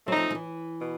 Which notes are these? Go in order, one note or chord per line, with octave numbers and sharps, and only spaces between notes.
F#3 A3 C4 D#4
F3
F3
E3
B2